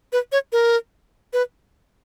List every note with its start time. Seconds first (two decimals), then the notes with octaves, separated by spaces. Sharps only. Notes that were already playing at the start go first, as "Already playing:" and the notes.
0.13 B4
0.32 C#5
0.52 A#4
1.33 B4